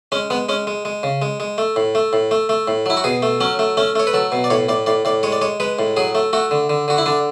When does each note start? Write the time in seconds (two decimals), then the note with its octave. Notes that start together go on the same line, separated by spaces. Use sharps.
0.12 G#3 C#4
0.30 G#3 B3
0.49 G#3 C#4
0.67 G#3
0.85 G#3
1.03 C#3
1.22 G#3
1.40 G#3
1.58 A3
1.76 A2
1.95 A3
2.13 A2
2.31 A3
2.49 A3
2.68 A2
2.86 F#3 E4
2.97 F#4
3.04 B2 G#4
3.22 A3
3.41 F#3 C#4
3.59 A3
3.77 A3 C#4
3.95 A3 C#5
4.07 B4
4.14 F#3 A4
4.32 B2
4.44 D5
4.50 A2 C#5
4.69 A2 D5
4.86 A2 D5
5.05 A2 D5
5.23 G#3 C#5
5.32 D5
5.41 G#3 C#5
5.60 G#3 B4
5.79 A2
5.97 F#3 G#4
6.15 A3
6.33 A3 F#4
6.51 D3
6.69 D3
6.88 D3 F#4
6.98 E4
7.06 D3 D4